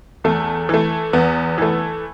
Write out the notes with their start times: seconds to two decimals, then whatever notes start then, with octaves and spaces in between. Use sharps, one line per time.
0.24 E2 A3
0.69 E3 A3
1.13 E2 B3
1.58 E3 A3